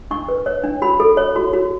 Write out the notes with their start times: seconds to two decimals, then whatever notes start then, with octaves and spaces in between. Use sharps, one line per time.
0.11 D4 C#6
0.29 B4
0.46 C#5
0.64 D4
0.82 F#4 B5
1.00 A4
1.17 C#5
1.36 F#4
1.53 F#4